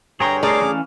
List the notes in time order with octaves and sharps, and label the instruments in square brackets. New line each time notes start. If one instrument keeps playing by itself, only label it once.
[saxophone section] G2 D3 C#5 [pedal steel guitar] G#4 G5 C6 [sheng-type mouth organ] A#5
[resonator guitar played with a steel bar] A3 D5 A#5 [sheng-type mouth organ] G#4 D6 [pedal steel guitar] A#4 C6
[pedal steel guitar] E3 C#4 F5